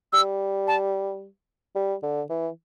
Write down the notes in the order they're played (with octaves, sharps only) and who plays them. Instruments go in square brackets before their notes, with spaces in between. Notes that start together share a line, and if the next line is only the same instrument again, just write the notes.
[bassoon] G3 [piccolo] E6
[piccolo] A5
[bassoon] G3
D3
E3